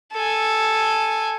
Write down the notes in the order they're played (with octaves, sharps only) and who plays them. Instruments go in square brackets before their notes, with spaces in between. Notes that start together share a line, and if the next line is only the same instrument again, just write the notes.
[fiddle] A4 G#5